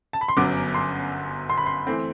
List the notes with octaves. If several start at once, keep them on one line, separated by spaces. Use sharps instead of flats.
A5
B5
C6
G1 F#2 F#3 B3 D6
C6
C6
B5
C6
E3 A3 C4